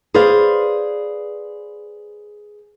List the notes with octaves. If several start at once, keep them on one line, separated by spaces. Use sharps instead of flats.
G#4 B4 C5 D5 F5